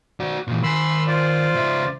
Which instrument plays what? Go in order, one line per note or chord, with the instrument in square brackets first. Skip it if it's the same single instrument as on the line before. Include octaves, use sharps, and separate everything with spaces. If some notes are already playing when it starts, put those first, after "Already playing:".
[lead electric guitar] F#4 D5
A#2 E3
[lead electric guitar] D#3 G#5 [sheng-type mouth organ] B5 C6 E6
[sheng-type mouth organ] F4 C5 D5
[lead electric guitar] C#2 E5